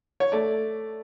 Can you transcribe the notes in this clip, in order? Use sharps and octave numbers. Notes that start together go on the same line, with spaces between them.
C#5
A3 D5